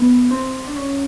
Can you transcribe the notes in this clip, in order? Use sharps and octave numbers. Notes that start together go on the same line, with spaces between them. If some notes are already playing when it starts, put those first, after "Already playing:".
Already playing: B3
C4
D4
C#4